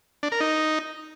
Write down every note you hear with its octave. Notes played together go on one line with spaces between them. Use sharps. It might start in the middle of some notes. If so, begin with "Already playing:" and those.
D4
A#4
D#4